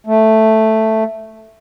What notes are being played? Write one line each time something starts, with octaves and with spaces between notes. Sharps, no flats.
A3